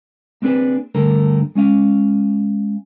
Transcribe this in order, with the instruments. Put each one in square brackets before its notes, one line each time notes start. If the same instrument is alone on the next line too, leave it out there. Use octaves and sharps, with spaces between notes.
[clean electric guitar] A#3 C4 D4 G#4 B4
G2 D3 A3 A#3 A#4
G#3 C#4 D#5 F5